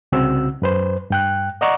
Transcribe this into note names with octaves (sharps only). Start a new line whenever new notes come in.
C2 C#3 C4 F#4 E6
F#2 B4 C5
G2 G5 F#6
D5 D#5 F#5 A#5 C#6 D6